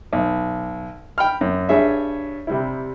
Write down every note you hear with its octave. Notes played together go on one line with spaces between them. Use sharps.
B1
G5 B5 F6
F#2
G2 G#4 C#5 E5
C3 G3 E4